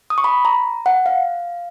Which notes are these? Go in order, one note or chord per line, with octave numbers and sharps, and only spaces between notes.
D#6
C#6
B5
A#5
F#5
F5